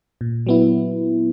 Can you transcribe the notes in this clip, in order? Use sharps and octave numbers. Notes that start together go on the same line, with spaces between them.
A#2
F#3 B3 E4